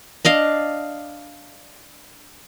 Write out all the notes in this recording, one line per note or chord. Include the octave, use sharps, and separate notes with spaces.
D4 D#5 F5